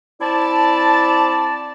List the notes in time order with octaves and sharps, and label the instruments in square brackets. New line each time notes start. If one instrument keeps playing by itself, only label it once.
[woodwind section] C4 E4 D5 A5